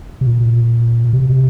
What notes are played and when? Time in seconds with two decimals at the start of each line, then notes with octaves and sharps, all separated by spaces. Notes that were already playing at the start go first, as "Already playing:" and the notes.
0.21 C3
0.27 A#2
1.13 C3